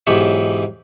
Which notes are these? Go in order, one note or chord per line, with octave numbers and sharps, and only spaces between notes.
B1 G#2 E3 G4 C#5 E5